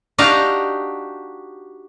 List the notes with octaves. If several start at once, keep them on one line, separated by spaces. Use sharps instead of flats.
D4 D#4 F#4 G4 D#5 F5